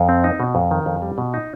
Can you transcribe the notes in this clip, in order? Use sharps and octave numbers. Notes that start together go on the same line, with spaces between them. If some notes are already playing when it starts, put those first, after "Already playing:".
Already playing: F2
C4
D#4
B2
F2
D#3
F2
G3
B2
D#4